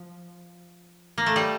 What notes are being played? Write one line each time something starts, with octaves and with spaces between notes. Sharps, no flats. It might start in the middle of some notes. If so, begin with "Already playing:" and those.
Already playing: F3
A#3
A3
G3